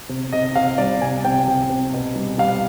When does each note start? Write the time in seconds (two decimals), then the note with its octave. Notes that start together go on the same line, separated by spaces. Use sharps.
0.09 C3
0.33 C3 D#5
0.56 C3 F5
0.78 G3 D5
1.02 C3 G#5
1.24 C3 G5
1.48 C3
1.69 C3
1.93 B2
2.16 G3
2.38 G3 F5